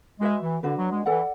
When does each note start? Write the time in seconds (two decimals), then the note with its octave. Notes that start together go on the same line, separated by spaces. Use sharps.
0.20 G#3 F#4 B4 E5
0.42 E3
0.63 D3 D4 F#4 B4
0.78 F#3
0.91 G#3
1.06 E3 A4 D5 F#5